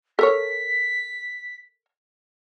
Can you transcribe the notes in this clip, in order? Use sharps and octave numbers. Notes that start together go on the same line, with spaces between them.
A4 A#4 C#5 B6